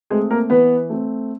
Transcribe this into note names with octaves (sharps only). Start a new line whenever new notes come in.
G#3 A3 C4 G#4
A#3 A#4
E3 B3 B4
A3 C4